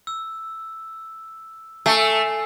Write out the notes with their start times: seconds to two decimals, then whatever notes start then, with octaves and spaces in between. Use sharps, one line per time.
0.07 E6
1.86 A3 G#5 E6 C7